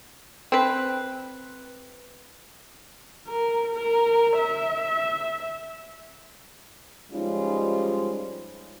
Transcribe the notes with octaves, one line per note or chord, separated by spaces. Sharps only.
C4 B4
A#4
A#4
E5
F3 G3 G#3 C#4 D#4 F4